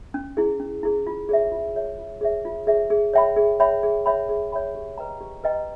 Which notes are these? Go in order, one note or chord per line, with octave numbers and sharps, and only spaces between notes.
C#4
E4 G#4
C#4
E4 G#4
F4
G#4 C#5 E5
F4
G#4 C#5 E5
F4
G#4 C#5 E5
F4
G#4 C#5 E5
G#4
C#5 E5 G5 B5
G#4
C#5 E5 G5 B5
G#4
C#5 E5 G5 B5
G#4
C#5 E5 G5 B5
G4
B4 D#5 G5 A#5
G4
B4 D#5 G5 A#5